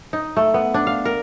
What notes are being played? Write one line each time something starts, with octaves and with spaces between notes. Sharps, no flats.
D#4
A3
B3
D4
F5
A#4